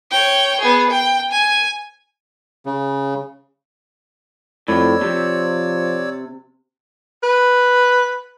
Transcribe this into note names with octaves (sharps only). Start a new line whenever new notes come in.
C#5 G5
B3 G#4
G5
G#5
C#3
F2 A2 C#5 D5 E6
C3 F3
B4